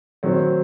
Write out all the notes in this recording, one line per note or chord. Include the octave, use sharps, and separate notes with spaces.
D#3 F#3 C4